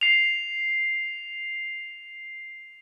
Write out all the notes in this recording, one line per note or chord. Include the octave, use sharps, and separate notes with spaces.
C7 F7